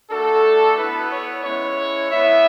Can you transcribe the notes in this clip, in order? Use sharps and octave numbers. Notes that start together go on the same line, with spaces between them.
A3 D4 F#4 A4
B3 E4 B4
C#5
G#3 C#4 E4 C#5
B3 E4 E5